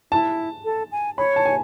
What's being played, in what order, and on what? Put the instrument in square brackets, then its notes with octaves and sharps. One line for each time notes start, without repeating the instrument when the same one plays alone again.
[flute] E4 [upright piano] A5
[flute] A4
G#5
[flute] C#5 [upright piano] B5
[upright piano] A5
G#5